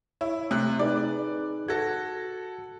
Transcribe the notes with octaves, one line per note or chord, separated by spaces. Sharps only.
E4 C#5
C3 A3 F#6
D#4 G#4 B4 D5
F#4 A4 G#6 A#6